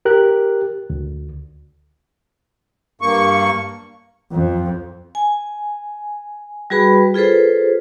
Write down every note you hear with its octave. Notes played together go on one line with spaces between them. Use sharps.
G4 A#4 F#6
D2
G2 A#3 C#6
F2
G#5
G3 F#4 G#4 B4 B5
F4 G#4 A4 B4 C5